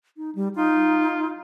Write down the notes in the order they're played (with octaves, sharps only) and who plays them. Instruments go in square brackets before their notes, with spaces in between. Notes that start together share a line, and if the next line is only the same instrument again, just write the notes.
[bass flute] D#4
G3
[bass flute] D#4 [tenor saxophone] F4